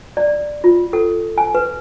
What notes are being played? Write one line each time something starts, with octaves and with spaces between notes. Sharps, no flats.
D5
F4
A4
G#5
B4